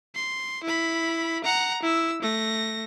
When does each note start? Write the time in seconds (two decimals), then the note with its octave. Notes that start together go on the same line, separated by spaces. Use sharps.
0.15 C6
0.64 E4 B5
1.44 F#5 A#5
1.82 E4 E6
2.22 A3 A#6